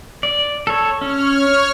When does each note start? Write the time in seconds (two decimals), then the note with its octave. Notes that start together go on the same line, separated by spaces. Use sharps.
0.23 D5
0.67 A4 C#5
1.01 C#4 C#5 F6